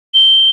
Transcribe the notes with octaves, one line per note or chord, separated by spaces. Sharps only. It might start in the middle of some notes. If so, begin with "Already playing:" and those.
G7